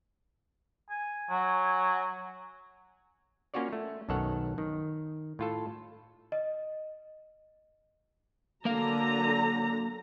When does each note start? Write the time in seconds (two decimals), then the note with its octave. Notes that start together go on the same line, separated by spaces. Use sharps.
0.90 G#5
1.29 F#3
3.54 A#3 C#4 F4 F#4 C#5 D5
3.73 A3
4.09 B1 F#2 D#3 A4 C#5 F#5
4.58 D#3
5.39 A2 F4 A4
6.32 D#5
8.65 D3 F#3 A#3 F5 A#5